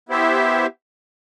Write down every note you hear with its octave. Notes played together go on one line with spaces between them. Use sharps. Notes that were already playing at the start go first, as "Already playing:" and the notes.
B3 E4 G4 C5 E5